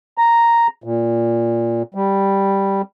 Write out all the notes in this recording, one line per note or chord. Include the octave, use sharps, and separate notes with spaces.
A#5
A#2
G3